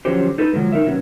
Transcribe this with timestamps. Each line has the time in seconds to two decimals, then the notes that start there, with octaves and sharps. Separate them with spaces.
0.05 D3 F3 F#3 C#4 G4 C5
0.38 D#4 A4 B4
0.53 D3 F3 F#3 G#3
0.72 D#4 A#4 E5
0.86 B2 D#3 F#3 B3 C#4